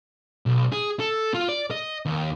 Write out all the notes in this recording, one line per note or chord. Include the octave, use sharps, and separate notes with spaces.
B1
G#4
A4
F4
D5
D#5
D#2